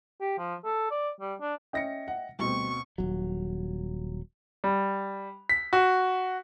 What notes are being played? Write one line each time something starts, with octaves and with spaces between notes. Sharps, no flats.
G4
F3
A4
D5
G3
D4
C#4 D#5 E5 G5 A#6 C#7
F#5
D2 B2 G3 C4 C#6
D#1 A#1 F#3
G3
B6
F#4